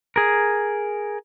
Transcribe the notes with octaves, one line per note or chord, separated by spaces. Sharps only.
G#4 A#4